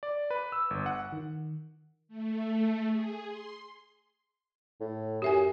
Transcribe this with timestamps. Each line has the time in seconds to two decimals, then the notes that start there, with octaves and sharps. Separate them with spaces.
0.03 D5
0.31 B4
0.52 E6
0.70 G1
0.86 F#5
1.12 D#3
2.08 A3
2.87 G#4
3.26 C6
4.80 A2
5.22 F#2 G4 E5 G#5